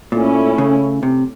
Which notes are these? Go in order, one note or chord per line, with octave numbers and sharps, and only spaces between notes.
A#2 A3 C#4 E4
C#3
C3